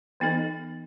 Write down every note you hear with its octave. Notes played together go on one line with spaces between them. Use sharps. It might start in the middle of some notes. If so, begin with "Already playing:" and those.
E3 B3 D#4 A4 D#5